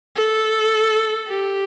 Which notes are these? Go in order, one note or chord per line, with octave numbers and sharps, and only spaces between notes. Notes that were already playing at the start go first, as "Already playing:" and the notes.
A4
G4